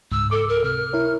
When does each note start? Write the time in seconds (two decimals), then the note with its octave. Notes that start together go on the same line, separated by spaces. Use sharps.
0.12 C#2 G#2 E6
0.31 A4 D6 E6
0.49 A#4
0.64 C3 F6
0.93 E4 A#4 C#5